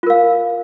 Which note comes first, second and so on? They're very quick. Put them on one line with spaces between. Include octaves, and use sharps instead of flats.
F4 A#4 F5